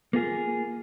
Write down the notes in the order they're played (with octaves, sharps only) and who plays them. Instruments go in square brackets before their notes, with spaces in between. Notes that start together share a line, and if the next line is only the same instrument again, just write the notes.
[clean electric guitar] A#3 F4 G#4